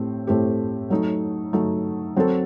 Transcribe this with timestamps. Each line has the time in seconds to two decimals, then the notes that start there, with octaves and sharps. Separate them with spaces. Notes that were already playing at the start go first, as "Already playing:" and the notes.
Already playing: A2 A3 C4 G4
0.27 A2 A3 C4 G4
0.90 F#3 A3 D#4
1.53 F#3 A3 D#4
2.16 F#3 C4 F#4 A4